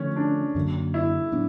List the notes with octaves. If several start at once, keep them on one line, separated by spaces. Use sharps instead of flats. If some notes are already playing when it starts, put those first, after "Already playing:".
Already playing: D3 F3 A3 C#4
D4
F#2 D3 F#3 A#3
E4
A2 F#3 B3 D4